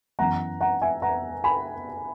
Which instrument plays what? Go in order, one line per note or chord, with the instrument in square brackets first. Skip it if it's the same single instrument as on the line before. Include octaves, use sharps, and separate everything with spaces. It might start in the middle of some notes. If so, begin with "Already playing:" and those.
[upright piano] F#2 E3 B3 F#5 A#5
F#5 A#5
E5 G#5
F#5 A#5
G#5 B5